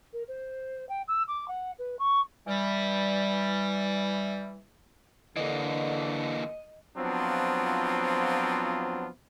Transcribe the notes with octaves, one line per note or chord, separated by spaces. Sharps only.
A#4
C5
G5
E6
D6
F#5
B4
C#6
E3 G3
D3 E3 A#3 D#5
F3 F#3 B3 C4 D4 F4